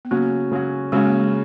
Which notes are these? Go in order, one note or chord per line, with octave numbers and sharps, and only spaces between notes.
B3
C#3 F#3 A#3 C#4 F#4
C#3 F#3 C#4 F#4
C#3 F#3 G#3 C#4 F#4
A#3
G#3